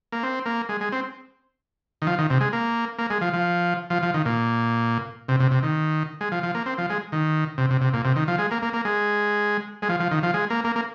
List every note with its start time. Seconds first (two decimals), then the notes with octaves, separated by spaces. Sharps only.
0.12 A#3
0.23 C4
0.46 A#3
0.69 G#3
0.81 G#3
0.92 C4
2.02 D#3
2.07 F3
2.19 D#3
2.30 C3
2.41 G#3
2.53 A#3
2.99 A#3
3.10 G#3
3.21 F3
3.33 F3
3.90 F3
4.03 F3
4.14 D#3
4.25 A#2
5.29 C3
5.40 C3
5.51 C3
5.63 D#3
6.21 G#3
6.32 F3
6.43 F3
6.55 A#3
6.66 C4
6.78 F3
6.90 G#3
7.12 D#3
7.58 C3
7.70 C3
7.81 C3
7.94 A#2
8.05 C3
8.16 D#3
8.28 F3
8.39 G#3
8.51 A#3
8.62 A#3
8.73 A#3
8.85 G#3
9.82 G#3
9.89 F3
10.00 F3
10.11 D#3
10.23 F3
10.34 G#3
10.50 A#3
10.64 A#3
10.76 A#3